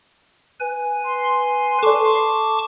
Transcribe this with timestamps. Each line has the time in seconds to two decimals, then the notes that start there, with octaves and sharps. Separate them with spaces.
0.60 B4 G#5
1.04 C6
1.83 A4 D5 A5 C#6 D6